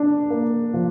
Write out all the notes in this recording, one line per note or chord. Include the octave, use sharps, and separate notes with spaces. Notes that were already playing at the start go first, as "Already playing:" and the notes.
Already playing: D4
A#3
F3